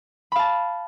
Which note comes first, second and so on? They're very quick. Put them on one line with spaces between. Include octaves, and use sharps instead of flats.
B5 F5 A5